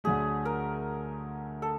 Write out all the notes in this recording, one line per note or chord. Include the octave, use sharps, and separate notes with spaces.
D2 D3 F#3 A3 G#4
A#4
A4